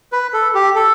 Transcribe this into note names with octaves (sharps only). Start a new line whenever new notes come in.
B4
A4
G4
A4